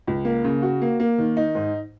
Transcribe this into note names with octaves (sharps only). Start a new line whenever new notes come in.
C#2
A#3
C#3
F#4
A#3
A#3
D#3
D#4
G#2